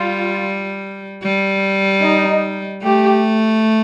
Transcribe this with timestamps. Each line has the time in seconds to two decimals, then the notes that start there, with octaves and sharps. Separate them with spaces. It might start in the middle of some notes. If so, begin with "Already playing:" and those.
Already playing: G3 F4
1.23 G3
2.03 D#4
2.83 A3 G4